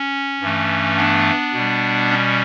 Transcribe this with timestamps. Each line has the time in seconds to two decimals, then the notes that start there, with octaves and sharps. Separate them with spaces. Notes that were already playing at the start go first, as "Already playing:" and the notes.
Already playing: C#4
0.41 G2 E3 A3
0.97 B3 D4
1.53 B2 G3
2.10 C#4